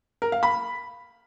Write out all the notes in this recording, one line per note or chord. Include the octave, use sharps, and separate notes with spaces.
A#4
F5
B5